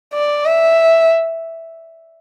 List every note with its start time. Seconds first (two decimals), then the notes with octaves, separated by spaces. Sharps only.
0.14 D5
0.46 E5